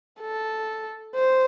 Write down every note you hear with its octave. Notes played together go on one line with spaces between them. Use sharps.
A4
C5